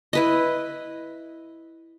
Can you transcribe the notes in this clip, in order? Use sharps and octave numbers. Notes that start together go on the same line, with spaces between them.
E4 B4 D#5